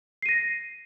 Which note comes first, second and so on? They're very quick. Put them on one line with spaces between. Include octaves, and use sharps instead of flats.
C7 D#7 A#6